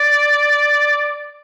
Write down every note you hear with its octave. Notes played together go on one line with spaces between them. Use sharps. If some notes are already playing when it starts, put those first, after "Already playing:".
Already playing: D5